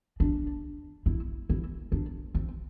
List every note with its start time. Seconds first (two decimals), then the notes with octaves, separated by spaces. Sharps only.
0.20 D4
1.06 E4
1.50 E4
1.92 D4
2.34 C4